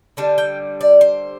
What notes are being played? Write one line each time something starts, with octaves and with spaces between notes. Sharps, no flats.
D3 G3 D4 A5
G5
D5
C5